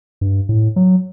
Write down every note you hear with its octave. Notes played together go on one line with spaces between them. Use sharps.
G2
A2
F#3